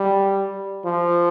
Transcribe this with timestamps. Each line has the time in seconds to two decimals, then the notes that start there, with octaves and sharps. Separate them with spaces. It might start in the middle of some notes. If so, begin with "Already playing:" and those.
Already playing: G3
0.86 F3